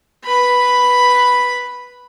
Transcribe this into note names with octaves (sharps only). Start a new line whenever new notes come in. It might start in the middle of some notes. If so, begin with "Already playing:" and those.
B4 B5